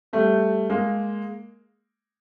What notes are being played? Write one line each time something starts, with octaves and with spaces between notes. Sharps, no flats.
G3 A3
G#3 A#3